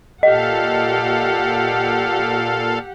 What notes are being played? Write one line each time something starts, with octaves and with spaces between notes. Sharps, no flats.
A#2 G4 A4 D#5 F5 F#5